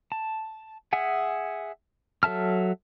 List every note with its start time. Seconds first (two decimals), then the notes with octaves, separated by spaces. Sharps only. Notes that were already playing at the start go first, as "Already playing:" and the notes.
0.12 A5
0.93 G#4 E5 F#5 G#5
2.23 F#3 A4 E5 A5 F6